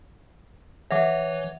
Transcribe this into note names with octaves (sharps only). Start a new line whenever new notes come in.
E3 C#5 E5 F#5 D6